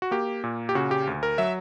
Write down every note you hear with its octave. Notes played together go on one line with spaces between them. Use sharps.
F#4
A#3 G4
A#2
G4
C#3 F#4
G4
D2
A#4
F#3 E5